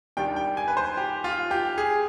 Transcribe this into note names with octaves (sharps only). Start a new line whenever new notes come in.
D#2 D#3 G3 D4 G5
G5
G#5
B4
C5
G4
F4
G4
G#4